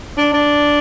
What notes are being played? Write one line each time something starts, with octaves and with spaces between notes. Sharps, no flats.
D4
D4